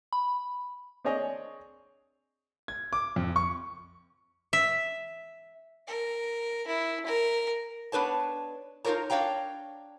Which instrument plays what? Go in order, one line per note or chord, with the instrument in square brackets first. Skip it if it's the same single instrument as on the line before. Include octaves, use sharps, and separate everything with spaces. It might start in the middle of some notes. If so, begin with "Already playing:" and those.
[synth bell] B5
[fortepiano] C4 D4 G#4 C#5 D#5 G#5
[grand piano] G#6
D6
F2
C#6
[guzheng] E5
[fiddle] A#4
E4
A#4
[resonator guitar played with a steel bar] B3 D4 B4 C#5 A5
D#4 F4 G4 A#4 C#5 A#5
D4 C#5 F5 G5 A#5